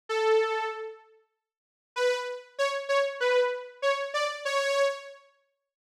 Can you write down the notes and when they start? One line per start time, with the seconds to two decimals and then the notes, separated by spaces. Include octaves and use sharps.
0.09 A4
1.96 B4
2.59 C#5
2.89 C#5
3.20 B4
3.82 C#5
4.14 D5
4.45 C#5